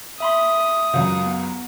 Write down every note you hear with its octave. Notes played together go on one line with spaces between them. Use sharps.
E5 B5 C6 D#6
C#2 F#2
B3